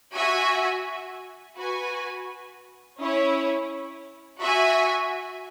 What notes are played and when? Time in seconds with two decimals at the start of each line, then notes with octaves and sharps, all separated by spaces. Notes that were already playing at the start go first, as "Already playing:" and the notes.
0.16 F#4 E5 G#5
1.57 F#4 B4 G#5
2.99 C#4 E4 C#5
4.40 F#4 E5 G#5